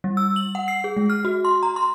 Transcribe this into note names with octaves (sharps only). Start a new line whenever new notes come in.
G3
E6
F#7
F#5
C7
G#4
G#3
F6
F#4
C6
A#5
C6